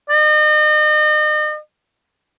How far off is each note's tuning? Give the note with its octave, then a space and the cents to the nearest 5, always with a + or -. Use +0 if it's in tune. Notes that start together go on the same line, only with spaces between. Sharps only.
D#5 -40